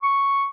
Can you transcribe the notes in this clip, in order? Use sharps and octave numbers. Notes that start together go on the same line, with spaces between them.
C#6